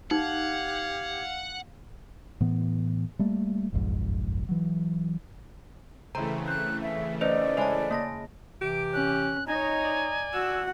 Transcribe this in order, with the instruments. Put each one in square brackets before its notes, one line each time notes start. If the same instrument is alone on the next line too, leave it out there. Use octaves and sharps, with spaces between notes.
[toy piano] D#4 [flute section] G4 G#6 [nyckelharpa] F5 [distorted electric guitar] F#5
[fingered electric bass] A2 E3 B3
G3 A3 A#3
F#1 B1 F2 G#2
E3 F#3
[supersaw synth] C#3 E3 A3 [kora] C4 E4 [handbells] A#5
[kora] C5 [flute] F#6
[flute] E5
[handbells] C#4 B4 C5 [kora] D#4 [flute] D5
[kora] G#3 E4 G#4 [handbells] C5 C#5 A5
[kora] C#3 [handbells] A#3 A5 A#6
[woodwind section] C3 E3 [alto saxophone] G4 [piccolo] D7
[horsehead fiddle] C#4 [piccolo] F#6
[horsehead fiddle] D#4 C#5 [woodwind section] D#5 A#5 [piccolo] G#5
[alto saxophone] D5
[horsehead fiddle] F#4 F#5 [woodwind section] E6